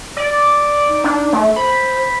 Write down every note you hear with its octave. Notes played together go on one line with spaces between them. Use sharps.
D5
D#4
D4
A3
C5 B5